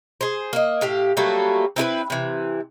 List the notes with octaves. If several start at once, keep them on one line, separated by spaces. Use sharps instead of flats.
G#4 C5
A#3 D#5
A2 G4 F5
F#3 G3 A3 A#3
C4 E4 G#4 B4
C3 E3